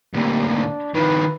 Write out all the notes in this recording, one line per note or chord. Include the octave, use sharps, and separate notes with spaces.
D2 A#2 G3
D4
D#3 F3 B4